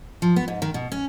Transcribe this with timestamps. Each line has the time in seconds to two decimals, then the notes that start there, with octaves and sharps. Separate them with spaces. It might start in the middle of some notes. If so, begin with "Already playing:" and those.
0.22 F3
0.36 B3
0.48 G#2
0.62 D#3
0.74 B2
0.92 C#4